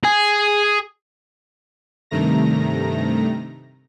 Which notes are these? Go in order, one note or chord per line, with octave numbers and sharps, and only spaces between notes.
G#4 G#5
G2 C3 D#3 A3 A#5 A#6